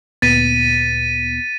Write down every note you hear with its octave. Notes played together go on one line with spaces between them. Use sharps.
D2 A#2 B3 A6 B6 D#7